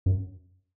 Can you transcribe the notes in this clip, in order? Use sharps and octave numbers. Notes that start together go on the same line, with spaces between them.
F#2